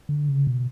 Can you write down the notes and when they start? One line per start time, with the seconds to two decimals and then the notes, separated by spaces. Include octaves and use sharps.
0.09 D3
0.29 C#3
0.47 B2